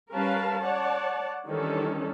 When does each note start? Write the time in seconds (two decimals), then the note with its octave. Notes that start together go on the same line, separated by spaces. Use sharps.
0.12 G3 C#4 A#4 B4 F5 A5
0.63 C#5 D5 F#5 A5
1.47 D#3 E3 G3 C#4 D4 A4